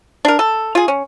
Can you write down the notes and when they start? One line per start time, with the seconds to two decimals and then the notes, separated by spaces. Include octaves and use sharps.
0.25 D4 A#4
0.39 A4
0.75 F4 G#4
0.88 C#4